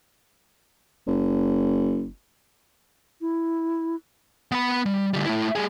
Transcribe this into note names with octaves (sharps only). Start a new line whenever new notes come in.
F#1
E4
B3 B5
G3
D2 G3
A3 E4
G3 G#4